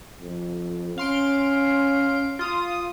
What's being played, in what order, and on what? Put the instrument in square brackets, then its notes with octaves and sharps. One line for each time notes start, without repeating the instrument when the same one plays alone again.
[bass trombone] F2
[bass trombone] C#4 [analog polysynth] F5 C6 D7
[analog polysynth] F4 D#6